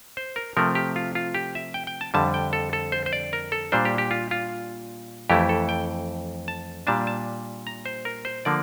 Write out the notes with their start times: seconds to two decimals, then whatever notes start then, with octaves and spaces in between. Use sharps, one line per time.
0.17 C5
0.36 A#4
0.57 C3 F3 A3 A#4
0.75 G4
0.96 F4
1.15 F4
1.35 G4
1.55 E5
1.74 G5
1.87 G5
2.01 A5
2.14 F2 D3 G3 A5
2.34 G5
2.53 A4
2.73 A4
2.92 C5
3.06 C5
3.13 D5
3.33 A#4
3.52 A4
3.72 A#2 G3 D4 C5
3.85 G4
3.98 G4
4.11 F4
4.31 F4
5.30 F2 E3 A3 E4 G4
5.49 A4
5.69 G5
6.48 A5
6.87 A#2 G3 D4 A5
7.07 A5
7.67 A#5
7.86 C5
8.05 A#4
8.25 C5
8.45 D3 F3 A#3 D5